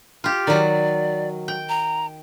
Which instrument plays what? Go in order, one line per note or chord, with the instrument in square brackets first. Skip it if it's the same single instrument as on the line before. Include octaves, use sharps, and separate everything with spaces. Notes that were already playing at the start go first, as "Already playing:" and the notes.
[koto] F4 G4
[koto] D#3 F#3 [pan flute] D5
[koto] G5
[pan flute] A#5